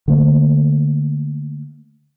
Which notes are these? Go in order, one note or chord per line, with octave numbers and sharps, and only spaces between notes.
D3 A3 A#3